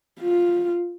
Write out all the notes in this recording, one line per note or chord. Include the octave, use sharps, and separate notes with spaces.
F4